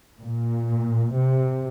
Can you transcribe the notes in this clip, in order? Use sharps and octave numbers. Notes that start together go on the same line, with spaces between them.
A#2
C3